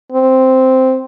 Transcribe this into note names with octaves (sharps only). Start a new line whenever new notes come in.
C4